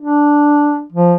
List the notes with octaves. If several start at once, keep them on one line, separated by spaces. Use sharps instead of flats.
D4
F3